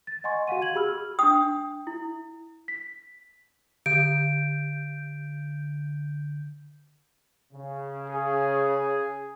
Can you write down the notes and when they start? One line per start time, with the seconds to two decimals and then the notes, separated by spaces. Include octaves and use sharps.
0.07 A6
0.24 D#5 F#5 G#5 C6 C#6
0.47 F#4 F5 F#5 D#7
0.61 F#4 G#6 F#7
0.74 G4 G#4 B5 E6 F6
1.19 D4 G5 D#6
1.87 E4
2.68 B6
3.86 D3 G6 D7
7.52 C#3
8.08 G#4